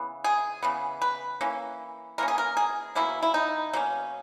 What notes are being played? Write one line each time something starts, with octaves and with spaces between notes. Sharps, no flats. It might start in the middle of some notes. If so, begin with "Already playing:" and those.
Already playing: C#3 E3 B3
G#4
C#3 E3 B3
B4
E3 A#3 C#4
E3 A#3 C#4 A#4
G#4
A#4
G#4
B2 F#3 A#3 C#4 E4
E4
D#4
B2 F#3 A#3 C#4 D#4